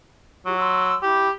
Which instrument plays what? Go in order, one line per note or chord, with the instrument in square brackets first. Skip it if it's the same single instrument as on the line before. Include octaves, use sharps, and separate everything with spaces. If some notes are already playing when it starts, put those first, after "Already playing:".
[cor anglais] F#3 [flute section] F4 G4
[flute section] C6 E6
[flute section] E4 [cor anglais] G4